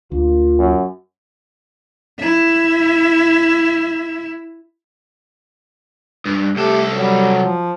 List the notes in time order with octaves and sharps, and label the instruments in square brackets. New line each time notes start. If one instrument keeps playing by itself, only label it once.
[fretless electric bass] D2 [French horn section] A#3 F4
[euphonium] F#2
[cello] E4 E5
[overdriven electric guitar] G2
[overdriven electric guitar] C2 A4 [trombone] A3 [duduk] G4
[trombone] F#3 [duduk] G3
[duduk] F3